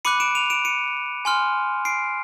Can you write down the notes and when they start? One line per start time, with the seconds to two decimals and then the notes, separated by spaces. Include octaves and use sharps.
0.05 B5 D6 F#6 C#7 D#7
0.20 D7 E7
0.35 D#7 F7
0.50 D7 E7
0.65 C#7 D#7
1.25 G#5 C6 F6
1.85 C7 D7